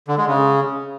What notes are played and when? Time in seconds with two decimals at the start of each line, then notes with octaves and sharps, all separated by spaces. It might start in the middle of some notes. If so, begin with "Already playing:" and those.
0.08 D3
0.18 G#3
0.28 C#3